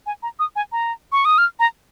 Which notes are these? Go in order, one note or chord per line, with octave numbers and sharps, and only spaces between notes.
G#5
A#5
D#6
G#5
A#5
C#6
D#6
F6
A#5